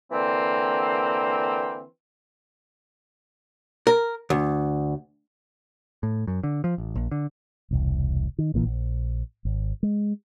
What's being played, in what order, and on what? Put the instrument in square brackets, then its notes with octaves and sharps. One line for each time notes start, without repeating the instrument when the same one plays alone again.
[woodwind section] D3 E3 A#3 C4
[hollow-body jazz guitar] A#4
D2
[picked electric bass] A2
F#2
D3
F3
A1
A#1
D3
[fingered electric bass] E1 C2
D#3
A#1 A#2 E3
A#1
G#1
G#3